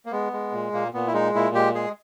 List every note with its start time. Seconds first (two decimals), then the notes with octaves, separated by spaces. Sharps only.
0.06 A#3
0.11 G#3 B3
0.33 G#3
0.52 A#2
0.73 A#2 A#3
0.93 A#2 B3
1.07 E4
1.13 G#3 D#4
1.35 A#2 E4
1.55 G#3 G4
1.75 G#3 G#4